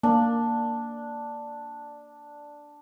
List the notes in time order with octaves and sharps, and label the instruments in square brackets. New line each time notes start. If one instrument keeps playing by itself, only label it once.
[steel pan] A#3 [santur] D4